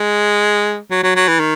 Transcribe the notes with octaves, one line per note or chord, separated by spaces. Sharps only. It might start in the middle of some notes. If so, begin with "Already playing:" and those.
Already playing: G#3
F#3
F#3
F#3
E3
D#3